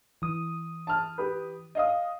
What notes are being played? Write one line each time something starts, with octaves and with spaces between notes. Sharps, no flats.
E3 D#6
A5 F6
G4 B4
D#5 F5 D#6